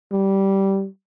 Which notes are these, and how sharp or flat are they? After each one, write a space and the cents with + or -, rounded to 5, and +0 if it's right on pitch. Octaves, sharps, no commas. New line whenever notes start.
G3 -10